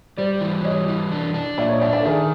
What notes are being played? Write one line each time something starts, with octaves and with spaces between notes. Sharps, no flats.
G3 C5 D5
E3
G3 C#5 D#5
E3
D4
D4
A#2 D5 E5
C#5 D#5
D4 D5 E5
D5 E5
A4
D#3 G#4 A#4